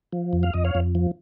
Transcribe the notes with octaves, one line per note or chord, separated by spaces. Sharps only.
F3
F2
F5
F2 D#5
C#5 F5
F2
F3